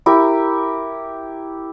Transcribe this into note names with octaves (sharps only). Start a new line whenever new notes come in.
E4 G4 A#4